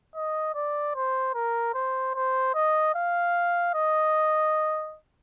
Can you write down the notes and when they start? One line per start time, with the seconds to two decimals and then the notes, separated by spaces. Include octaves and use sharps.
0.15 D#5
0.55 D5
0.95 C5
1.35 A#4
1.74 C5
2.15 C5
2.55 D#5
2.95 F5
3.74 D#5